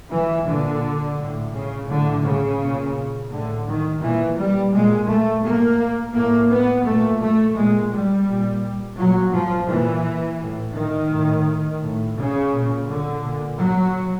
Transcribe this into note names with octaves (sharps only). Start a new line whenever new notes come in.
E3
A#2 D3
A2
C#3
A2 D3
C#3
A#2
A2 D3
D#3
A#2 E3
G3
A#2 G#3
A3
A2 A#3
A2 A#3
B3
A#2 A3
A3
A#2 G#3
G3
A#2
A#2 F#3
F3
A#2 E3
A2
D#3
A2
A2
C#3
A#2
D3
A#2
F#3